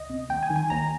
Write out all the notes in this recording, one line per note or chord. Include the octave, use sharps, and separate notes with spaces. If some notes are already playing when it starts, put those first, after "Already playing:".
Already playing: C#2 D#5
C3
D#2 G5
G#5
D#3
G#5
D#2 A#5